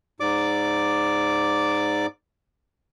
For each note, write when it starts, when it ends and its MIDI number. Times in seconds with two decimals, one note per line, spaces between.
0.20 2.06 44
0.20 2.06 74
0.20 2.06 86